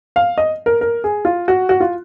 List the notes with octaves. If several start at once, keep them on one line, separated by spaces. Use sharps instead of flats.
F5
D#5
A#4
A#4
G#4
F4
F#4
F#4
F4